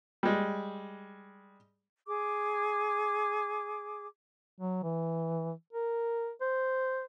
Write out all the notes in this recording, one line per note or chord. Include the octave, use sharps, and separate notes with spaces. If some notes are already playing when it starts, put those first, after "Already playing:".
G3 G#3
G#4 D6
F#3
E3
A#4
C5